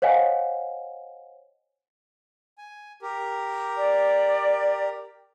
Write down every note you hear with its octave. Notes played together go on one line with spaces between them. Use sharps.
C5 C#5 D#5 F5 F#5 G#5
G#5
G4 A#4
D5